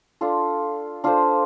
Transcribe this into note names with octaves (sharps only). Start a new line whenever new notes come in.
D4 F4 A4
D4 F4 A4 C5